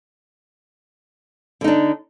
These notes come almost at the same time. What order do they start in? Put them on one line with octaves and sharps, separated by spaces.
D3 D#4 D4